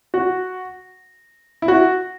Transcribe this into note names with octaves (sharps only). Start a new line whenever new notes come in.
F#4
E4
F#4